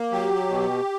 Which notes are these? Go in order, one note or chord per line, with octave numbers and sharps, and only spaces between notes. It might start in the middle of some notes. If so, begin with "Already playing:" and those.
Already playing: A#3
F#3 G4
B2